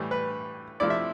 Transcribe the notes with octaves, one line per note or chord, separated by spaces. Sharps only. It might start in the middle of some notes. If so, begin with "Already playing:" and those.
Already playing: A2 E3 G3
B4
C3 F3 A3 E4 D5
E5